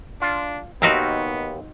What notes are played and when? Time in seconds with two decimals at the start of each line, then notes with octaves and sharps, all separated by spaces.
0.22 D4 F4
0.82 D#2 B3 C4 D#4 F#4 A#4 E5